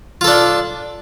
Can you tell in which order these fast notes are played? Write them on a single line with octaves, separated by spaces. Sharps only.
F4 A4 D4